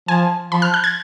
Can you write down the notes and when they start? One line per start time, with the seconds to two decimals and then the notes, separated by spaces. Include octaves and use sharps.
0.08 F3 G#5
0.51 F3 B5
0.62 F6
0.74 F#6
0.84 G#6